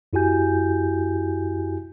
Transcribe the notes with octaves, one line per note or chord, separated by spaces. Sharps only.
F#2 E4 F#4 G4 G#5 G6